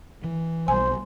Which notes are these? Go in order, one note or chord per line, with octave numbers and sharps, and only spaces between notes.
E3
B1 G3 C5 G#5